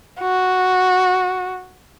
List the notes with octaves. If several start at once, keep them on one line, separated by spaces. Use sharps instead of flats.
F#4